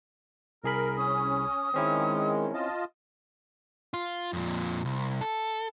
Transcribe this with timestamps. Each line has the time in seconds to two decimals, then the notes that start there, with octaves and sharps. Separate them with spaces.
0.64 C2 G#4 A#4 B5
0.97 C#4 D#6
1.74 D#3 G#3 C4 C#4 E4
2.54 F4 D#5 A5
3.94 F4
4.33 F2 A#2
4.85 C2
5.21 A4